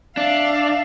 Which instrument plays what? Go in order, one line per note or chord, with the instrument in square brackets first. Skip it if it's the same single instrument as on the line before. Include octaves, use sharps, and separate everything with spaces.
[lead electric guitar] D4 [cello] E5 F5